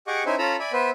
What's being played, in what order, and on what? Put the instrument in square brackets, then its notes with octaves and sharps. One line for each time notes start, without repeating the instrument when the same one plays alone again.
[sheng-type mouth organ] G4 G#4 D#5 F#5 C#6 D6
C#4 D#4 E4 C5 E5 G#5
C#4 F4 A4 A#5 B5 E6
D5 E5 G#5 B5
B3 B4 C5 E5